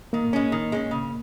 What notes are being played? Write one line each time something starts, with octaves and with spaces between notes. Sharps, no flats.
D#3 A#3
G#3 C#4
D#3
G#3 C#4
C#3